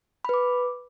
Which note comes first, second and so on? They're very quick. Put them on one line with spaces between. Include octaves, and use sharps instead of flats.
B5 B4 D6